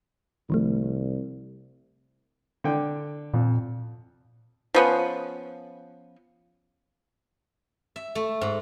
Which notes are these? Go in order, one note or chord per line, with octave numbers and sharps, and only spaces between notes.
C2 D#3 F3 A3
D3 G5
F2 A#2
F3 B3 C#4
E5
A3
G#2